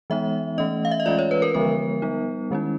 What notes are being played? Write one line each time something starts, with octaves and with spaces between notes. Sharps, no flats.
E3 G#3 B3 D#4 E5
E3 A3 C#4 D#5
F5
E5
D#5
E3 G#3 C#4 F4 D5
C#5
B4
A#4
D3 F3 G#3 B3 A#4
G3 B3 D#4
D#3 G#3 C#4 E4